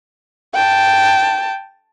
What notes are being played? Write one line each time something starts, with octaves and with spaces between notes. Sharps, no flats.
G5 A5